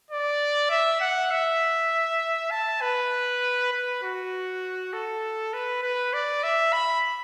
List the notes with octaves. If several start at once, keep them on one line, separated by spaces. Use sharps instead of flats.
D5
E5
F#5
E5
A5
B4
B4
F#4
A4
B4
B4
D5
E5
B5